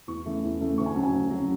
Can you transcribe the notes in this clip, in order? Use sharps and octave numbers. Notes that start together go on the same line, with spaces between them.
E2 C#6
C#3 E3 A3
E2
C#3 E3 A3
D2 C#6
G#5
C#3 F#3 C#4 A5
G#5
D2
C#3 F#3 C#4